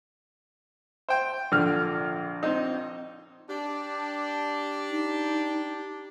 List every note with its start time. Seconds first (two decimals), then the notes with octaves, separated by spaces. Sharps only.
1.09 C5 G5
1.52 A#1 D3 F6
2.43 C4 D#4
3.48 D4 G4
4.90 D#4